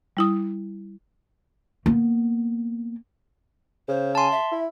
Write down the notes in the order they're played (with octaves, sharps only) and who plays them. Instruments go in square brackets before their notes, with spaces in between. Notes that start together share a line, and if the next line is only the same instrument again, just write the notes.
[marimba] G3 E4 D#6
[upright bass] A#3 B3
[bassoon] C#3 [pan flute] C5
[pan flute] G#5 [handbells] A5 C6
[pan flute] E5
[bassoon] E4